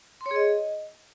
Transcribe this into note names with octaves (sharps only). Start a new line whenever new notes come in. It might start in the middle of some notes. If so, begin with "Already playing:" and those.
C6
C#5
G#4
D#5